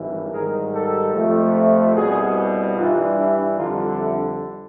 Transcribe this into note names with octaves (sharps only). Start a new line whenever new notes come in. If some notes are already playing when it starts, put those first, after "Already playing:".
Already playing: G#1 G2 E3
G#2 D#3 G3 G#4 A#4
G4 A4
F2 C3 F3 A3
C2 B2 G3 F#4 G#4
G2 E3 G3 D#4 F4
D4 E4
F2 D3 G3 D#4 F4
D4 E4